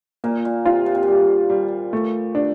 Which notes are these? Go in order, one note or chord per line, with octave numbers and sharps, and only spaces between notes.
A#2 A#3
A#2
C3 F4
A#2
C3
A#2
G3
G3
A3
D4